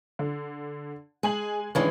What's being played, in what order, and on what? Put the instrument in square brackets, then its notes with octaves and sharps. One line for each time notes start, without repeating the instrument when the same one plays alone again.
[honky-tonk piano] D3
[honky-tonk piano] G#3 G#5 F#7 [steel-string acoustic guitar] G#4
[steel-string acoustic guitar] G2 E3 G#3 [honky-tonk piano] D#3 C#4 D4